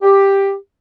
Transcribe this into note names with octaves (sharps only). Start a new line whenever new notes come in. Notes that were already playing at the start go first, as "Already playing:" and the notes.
G4